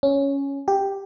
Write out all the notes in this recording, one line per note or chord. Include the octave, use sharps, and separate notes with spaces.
C#4
G4